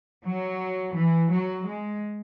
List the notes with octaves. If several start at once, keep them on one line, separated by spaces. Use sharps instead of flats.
F#3
E3
F#3
G#3